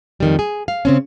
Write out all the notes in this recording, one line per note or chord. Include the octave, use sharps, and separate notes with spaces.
F2 D#3 G3
G#4
F5
C#3 C4 C#4